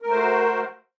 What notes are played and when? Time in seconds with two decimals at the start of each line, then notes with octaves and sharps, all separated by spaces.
0.02 A#4
0.06 A3
0.11 C5
0.16 F#4